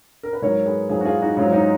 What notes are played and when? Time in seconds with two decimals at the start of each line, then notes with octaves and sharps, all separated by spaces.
0.23 A#4
0.33 B4
0.42 G#2 F#3 A#4 C#5
0.66 G#4 B4
0.89 G#2 F#3 F4 G#4
1.01 F#4
1.05 F4 G#4
1.21 D#4 F#4
1.37 G#2 F#3 C#4 F4
1.53 D#4